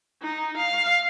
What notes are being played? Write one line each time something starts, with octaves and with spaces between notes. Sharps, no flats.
D#4
F5